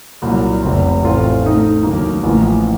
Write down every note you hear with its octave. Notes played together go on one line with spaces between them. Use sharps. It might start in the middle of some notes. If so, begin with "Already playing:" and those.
C2 A#2 F#3
F1 F2 C3
A1 A2 A3 C4 F4
A2 A3 D#4
D#2 D#3 F#3 A#3 D#4
A1 A2 F3 A#3